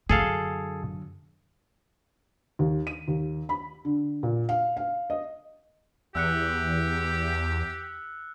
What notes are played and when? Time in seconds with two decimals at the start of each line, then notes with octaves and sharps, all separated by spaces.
0.09 F#2 D3 G#4 A4 F5
2.59 D#2
2.87 D#7
3.08 D#2
3.49 B5
3.85 D3
4.23 A#2
4.49 F5
4.77 F5
5.10 D#5
6.15 E2 G4 E6 F#6 C#7